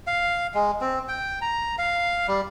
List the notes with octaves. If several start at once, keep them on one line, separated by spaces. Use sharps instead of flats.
F5
G#3
C4
G5
A#5
F5
G3